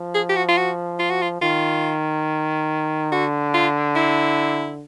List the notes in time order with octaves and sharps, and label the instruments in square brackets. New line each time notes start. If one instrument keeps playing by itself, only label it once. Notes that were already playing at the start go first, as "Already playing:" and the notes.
Already playing: [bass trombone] F3
[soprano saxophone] G#4
G4
F#4
F4
F#4
F4
F#4
F4
[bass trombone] D#3 [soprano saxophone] F4
[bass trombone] D3 [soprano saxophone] F#4
[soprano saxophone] F4
E4